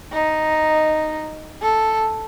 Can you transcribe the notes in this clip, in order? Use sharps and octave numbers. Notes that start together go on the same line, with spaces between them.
D#4
A4